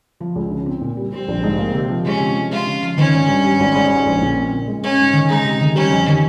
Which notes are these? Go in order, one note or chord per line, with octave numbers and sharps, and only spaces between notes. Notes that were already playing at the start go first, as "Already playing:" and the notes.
F3
C#2
C#3
C4
A#2
G3
G3 C4
A#1
G#2
A#3
C3
F3
G#3 C#4
C3
F3
G#3 F4
C#3
F3
D#3 C#4
G#1
G2
G3
G#1
G#2
G#3
A#1
A#2
C4
A#2
G#3
G#3 C#4
G#2
D#3
G#3 D#4
C3
D#3
G3 C#4
F2
D#3